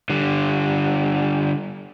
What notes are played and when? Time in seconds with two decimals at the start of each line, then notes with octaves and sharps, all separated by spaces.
0.10 D3 G3